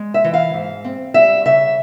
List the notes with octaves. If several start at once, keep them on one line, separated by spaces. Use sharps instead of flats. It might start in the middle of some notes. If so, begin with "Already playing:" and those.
Already playing: G#3
E5
E3
F5
G#2
C4
G3 E5
C#3 E5